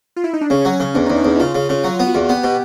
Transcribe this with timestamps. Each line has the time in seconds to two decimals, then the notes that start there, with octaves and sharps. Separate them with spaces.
0.16 F4
0.24 E4
0.33 D#4
0.41 D4
0.50 C#3 C#4
0.65 F#3
0.80 C#3
0.94 E2 D4
1.06 D#4
1.10 E2
1.17 D#4
1.25 E2 E4
1.39 C#3 F4
1.55 C#3
1.69 C#3
1.84 F#3 F4
2.00 B3
2.07 F#4
2.15 E2
2.29 B3 G4
2.44 B2